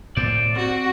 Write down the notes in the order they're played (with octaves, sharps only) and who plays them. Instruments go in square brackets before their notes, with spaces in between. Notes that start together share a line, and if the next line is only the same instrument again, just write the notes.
[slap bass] A2 [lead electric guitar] C5 D5
[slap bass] C4 [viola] F#4